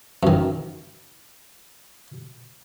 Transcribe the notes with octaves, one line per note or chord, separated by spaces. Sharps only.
F#2 D#3